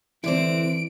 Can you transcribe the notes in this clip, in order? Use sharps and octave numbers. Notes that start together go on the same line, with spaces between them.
D3 E3 C4 E4 D5 D7